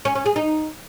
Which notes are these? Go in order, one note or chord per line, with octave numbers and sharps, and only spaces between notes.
C#4
C#4
G#4
D#4